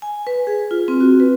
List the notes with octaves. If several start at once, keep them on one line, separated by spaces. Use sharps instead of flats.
G#5
B4
G#4
F4
C4
F#4
B4